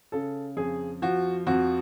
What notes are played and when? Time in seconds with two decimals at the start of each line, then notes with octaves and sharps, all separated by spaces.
0.12 C#3 A4
0.57 F2 G#4
1.02 F3 F#4
1.47 F2 F#4